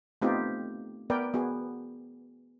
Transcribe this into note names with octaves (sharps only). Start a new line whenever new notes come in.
A3 B3 C4 D#4 F4 G4
B3 A#4 B4 D5 G5
B3 F#4 G#4